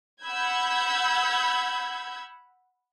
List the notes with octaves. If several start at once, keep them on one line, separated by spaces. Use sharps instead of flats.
F#5 B5 E6 G6 G#6